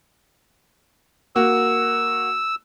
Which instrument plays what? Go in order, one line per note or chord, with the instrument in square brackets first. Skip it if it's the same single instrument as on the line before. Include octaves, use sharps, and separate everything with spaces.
[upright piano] A#3 F#4 [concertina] E6